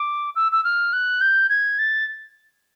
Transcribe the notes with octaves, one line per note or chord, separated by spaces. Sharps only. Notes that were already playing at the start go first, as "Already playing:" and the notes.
Already playing: D6
E6
E6
F6
F#6
G6
G#6
A6